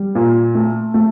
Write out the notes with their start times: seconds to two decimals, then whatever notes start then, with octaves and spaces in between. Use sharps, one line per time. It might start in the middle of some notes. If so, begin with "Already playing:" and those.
Already playing: G3
0.15 A#2
0.55 A3
0.94 A3